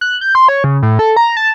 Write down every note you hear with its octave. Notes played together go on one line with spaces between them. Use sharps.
F#6
G6
C6
C#5
C#3
A2
A4
A#5
A5